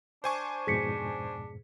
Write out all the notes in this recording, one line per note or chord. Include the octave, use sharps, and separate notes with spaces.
D4 C5 G#5 C#6
F2 G#2 B2 G#4 B6 C#7